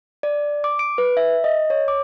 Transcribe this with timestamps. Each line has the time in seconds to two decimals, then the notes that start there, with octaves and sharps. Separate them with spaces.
0.23 D5
0.64 D6
0.79 D7
0.98 B4
1.17 E5
1.44 D#5
1.70 C#5
1.88 D6